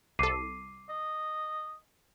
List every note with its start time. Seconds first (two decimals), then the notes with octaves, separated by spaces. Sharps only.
0.19 C2 A4 D6 C7 D#7
0.89 D#5